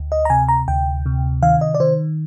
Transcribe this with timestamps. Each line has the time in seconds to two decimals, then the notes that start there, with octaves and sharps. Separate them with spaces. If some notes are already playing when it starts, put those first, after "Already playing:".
Already playing: D2
0.12 D#5
0.25 A#5
0.30 C3 G#5
0.48 A#5
0.68 D2 G5
1.06 C3
1.42 D#3 F5
1.61 D#5
1.74 D5
1.80 D#3 C5